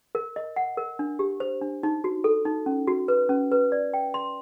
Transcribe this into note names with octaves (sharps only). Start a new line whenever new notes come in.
A#4
D#5
F#5
A#4
D4
G4
C5
D4
D#4
F#4
A4
D#4
C#4
F#4
B4
C#4
B4
D5
G5
C6